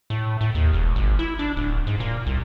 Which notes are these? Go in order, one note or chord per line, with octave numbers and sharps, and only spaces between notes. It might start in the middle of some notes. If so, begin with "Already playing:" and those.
A2
A2
D#2
E1
G#1
E4
D4
D1
G#2
A#2
C2